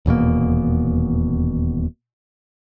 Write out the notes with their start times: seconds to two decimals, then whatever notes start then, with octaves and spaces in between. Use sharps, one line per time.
0.06 D#1 E2 B2 A#3